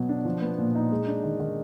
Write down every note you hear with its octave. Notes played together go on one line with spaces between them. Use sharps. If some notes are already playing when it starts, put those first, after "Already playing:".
Already playing: B2 F#3 B3
D4
F3
B3
A#2
D#4
G#3
D4
D#3
D#3